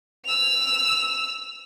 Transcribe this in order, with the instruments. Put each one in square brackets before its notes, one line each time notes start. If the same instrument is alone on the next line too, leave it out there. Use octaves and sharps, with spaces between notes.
[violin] E6 F7